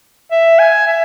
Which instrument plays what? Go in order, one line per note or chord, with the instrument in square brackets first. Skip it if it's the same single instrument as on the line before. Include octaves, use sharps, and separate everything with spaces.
[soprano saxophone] E5
G#5
E5